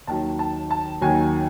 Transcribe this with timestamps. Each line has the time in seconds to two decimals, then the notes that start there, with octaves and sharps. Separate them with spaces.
0.07 D#2 D#3 F#3 A5
0.39 A5
0.71 A5
1.01 D#2 D#3 F#3 G#5